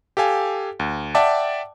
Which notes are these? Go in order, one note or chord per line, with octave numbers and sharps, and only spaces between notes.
G4 A4 F5 G#5
D2
D5 E5 F#5 G5 A5 D6